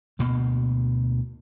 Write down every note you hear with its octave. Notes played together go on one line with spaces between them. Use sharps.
D2 B2 A#3